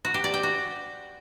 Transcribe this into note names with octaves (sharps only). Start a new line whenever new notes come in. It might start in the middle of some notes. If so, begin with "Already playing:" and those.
F#4
G4
D5
G5
F#4